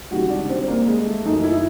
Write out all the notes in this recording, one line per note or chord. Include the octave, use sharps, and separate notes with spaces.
C#2 C3 D#3 G3 F#4
D4
C4
A#3
G#3
A3
F#2 D#3 F#3 D#4
E4